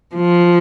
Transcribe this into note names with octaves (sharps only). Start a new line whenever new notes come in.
F3